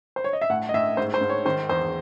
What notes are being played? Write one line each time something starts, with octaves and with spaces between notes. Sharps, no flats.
C5
C#5
D#5
E5
A2 F#5
D#5
A2 E5
G#2 C5
C5
G#2
C#5
D#3 C5
E2 C5